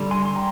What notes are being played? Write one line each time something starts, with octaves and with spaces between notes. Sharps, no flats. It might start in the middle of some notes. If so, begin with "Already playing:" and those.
Already playing: D3 G3
G#5 C6
C6
G5 A#5